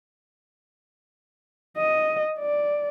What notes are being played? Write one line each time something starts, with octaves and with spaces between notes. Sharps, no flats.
D#5
D5